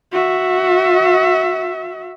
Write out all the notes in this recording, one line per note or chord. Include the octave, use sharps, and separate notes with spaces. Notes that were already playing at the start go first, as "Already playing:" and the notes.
F#4 E5